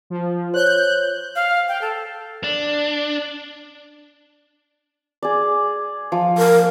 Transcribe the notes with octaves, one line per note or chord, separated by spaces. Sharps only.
F3
C5 C#5 F#6 G6
F5
G5
A4
D4
G#4 D5
F3
A#4